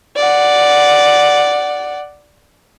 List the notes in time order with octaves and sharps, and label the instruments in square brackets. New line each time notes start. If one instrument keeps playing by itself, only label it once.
[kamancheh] D5 F#5